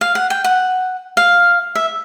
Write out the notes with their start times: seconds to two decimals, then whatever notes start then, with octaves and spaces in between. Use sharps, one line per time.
0.01 F5
0.15 F#5
0.30 G5
0.44 F#5
1.17 F5
1.75 E5